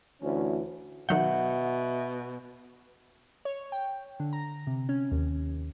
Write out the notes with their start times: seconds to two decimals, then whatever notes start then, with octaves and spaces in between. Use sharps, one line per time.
0.22 D2 E3 C#4
1.09 B2 D#3 F#3 E5 F#5 G6
3.45 C#5
3.72 G5
4.20 D3
4.33 A#5
4.67 C3
4.89 C#4
5.12 D#2